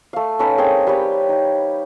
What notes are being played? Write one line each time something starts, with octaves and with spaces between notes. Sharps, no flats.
A3 F5
C#4 D#4 A4 B4
C4 G#4 A#4 G5
G3 G4 B4 C#5
D#4